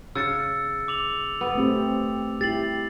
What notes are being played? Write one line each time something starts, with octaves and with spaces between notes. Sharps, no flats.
C#3 E6 A6 C#7
D6 F7 F#7
B3
A3 C4 G4
E4 G4 A6 C7 F#7